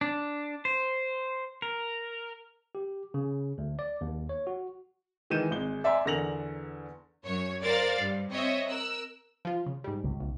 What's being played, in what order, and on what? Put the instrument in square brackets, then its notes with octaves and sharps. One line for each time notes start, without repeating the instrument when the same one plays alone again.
[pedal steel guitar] D4
C5
A#4
[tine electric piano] G4
C#3
D2
D5
D#2
C#5
F#4
[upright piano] D#3 E3 G#3 G6 D#7 E7
G#1 G#3 G7
D5 E5 G#5 A#5 C6
E2 D3 A#4 A#6 F7 F#7
[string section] F#2 C#5
A#4 C5 D5 F5 A6
G2
C4 C#5 D#5 E5
A#4 E6 F#6
[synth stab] F3 F4
C#3
G#2 G3
[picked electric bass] C#2
[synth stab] B1